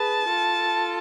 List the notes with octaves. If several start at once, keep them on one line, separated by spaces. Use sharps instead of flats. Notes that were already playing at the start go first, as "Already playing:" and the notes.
Already playing: G#4 B4 A5
F4 A4